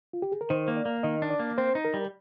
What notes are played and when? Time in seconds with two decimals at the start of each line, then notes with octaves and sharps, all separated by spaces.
0.13 F4
0.22 G4
0.32 G#4
0.41 A#4
0.50 D#3 C5
0.68 A#3
0.77 D5
0.86 A#3
1.03 D#3 D#5
1.22 D4
1.30 D5
1.40 A#3
1.58 C4 C5
1.75 D#4
1.85 A#4
1.94 G3